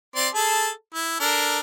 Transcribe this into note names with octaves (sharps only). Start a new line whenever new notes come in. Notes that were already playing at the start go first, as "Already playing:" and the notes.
C4 D5 C6
G#4 A4 A5
E4
D4 A4 A#4